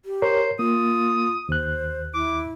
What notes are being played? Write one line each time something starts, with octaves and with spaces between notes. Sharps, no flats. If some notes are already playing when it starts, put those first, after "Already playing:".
G4
A#4 C5 C#5
A#3 F4 D#6
D#2 C5 F#6
E4 D6